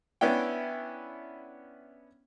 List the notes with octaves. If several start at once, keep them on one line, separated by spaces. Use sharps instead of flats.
B3 C#4 D4 E4 G5